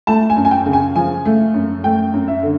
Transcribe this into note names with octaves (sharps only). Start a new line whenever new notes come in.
A3 A5
G#5
F#2
G#5
G5
C#3
G#5
F3 G#5
A3
F#2
A3 G5
F#2
E5
D3